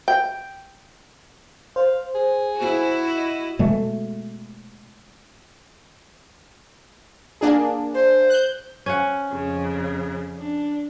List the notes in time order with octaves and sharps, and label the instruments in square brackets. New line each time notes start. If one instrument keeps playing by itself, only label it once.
[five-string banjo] G5
[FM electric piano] C5 [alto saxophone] F5
[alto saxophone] G#4
[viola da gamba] E4 F#4
[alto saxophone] D#5
[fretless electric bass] B2 G#3 A3
[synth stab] A#3 D4 G#4
[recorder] C5
[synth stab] F#6 G6
[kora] C#4 F#5
[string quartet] F2 C#3
D4